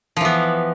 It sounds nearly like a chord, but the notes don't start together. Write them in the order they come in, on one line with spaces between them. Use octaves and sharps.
F3 E3 B3